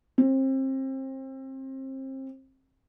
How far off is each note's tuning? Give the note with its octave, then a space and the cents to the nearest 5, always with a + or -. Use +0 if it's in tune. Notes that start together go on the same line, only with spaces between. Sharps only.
C4 +30